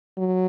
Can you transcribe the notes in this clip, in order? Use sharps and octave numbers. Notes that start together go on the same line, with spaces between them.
F#3